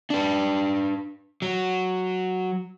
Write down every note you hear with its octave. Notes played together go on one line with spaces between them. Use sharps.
D4 B4
F#3